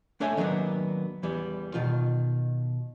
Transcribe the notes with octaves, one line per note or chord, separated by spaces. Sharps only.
A3 D4 A4 C#5 E5 G#5
D#3 F#3 A#3 B3 D4
E2 E3 G3 B3
B2 D#3 F4